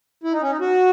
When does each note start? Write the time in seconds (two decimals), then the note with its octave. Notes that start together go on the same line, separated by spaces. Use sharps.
0.24 E4
0.33 D#4
0.42 C#4
0.50 D#4
0.60 F#4